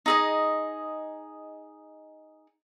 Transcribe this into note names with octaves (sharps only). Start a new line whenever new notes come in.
D#4 G#4 D#5